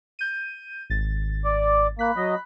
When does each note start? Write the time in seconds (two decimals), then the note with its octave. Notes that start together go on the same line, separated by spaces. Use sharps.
0.19 G6 D#7
0.90 G#1 A6
1.45 D5
1.99 A#3 B5 F#6 B6
2.16 F#3 D#5